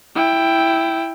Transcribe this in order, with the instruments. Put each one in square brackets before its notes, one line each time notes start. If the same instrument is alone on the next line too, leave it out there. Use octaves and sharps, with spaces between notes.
[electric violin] E4 G5